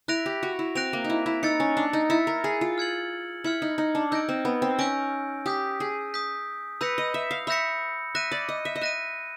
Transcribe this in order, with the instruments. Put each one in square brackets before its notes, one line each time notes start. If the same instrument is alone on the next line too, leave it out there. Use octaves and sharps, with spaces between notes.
[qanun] E4 [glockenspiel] F#6 A#6 D7 F7
[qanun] G4
F#4
E4
[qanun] C4 [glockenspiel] F#6 A#6 D7 F7
[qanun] A#3
D#4
E4
E4
[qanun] D#4 [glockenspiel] E6 A6 C#7
[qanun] C#4
D4
D#4
[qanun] E4 [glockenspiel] E6 A6 C#7
[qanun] A#4
G#4
F4
[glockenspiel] F6 G#6 C#7 F#7
[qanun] E4 [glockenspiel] F6 G#6 C#7 F#7
[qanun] D#4
D#4
D4
[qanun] D#4 [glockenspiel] E6 G6 A#6 D7
[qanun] C4
B3
C4
[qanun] C#4 [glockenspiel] E6 G6 A#6 D7
[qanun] G4 [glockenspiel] D#6 G6 B6
[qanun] G#4
[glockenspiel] D#6 G6 B6
[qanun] B4 [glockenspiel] B5 E6 G6 A#6 C#7
[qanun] D#5
E5
F5
[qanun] E5 [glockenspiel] B5 E6 G6 A#6 C#7
[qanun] E5 [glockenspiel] F#6 A#6 D#7
[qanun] D5
D#5
E5
D#5
[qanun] E5 [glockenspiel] F#6 A#6 D#7